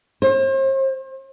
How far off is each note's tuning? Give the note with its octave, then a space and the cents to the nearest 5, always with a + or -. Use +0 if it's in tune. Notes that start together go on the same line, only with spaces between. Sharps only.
C5 +40